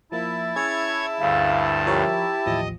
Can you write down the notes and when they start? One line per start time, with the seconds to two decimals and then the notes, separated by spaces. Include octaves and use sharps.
0.12 F3 A#3 E4 A5
0.56 C#4 G#4 C#5 E5 G#6
1.20 D2 G2 F5
1.86 F3 G4 A#4 C#5
2.46 A1 D#2 F3 D#5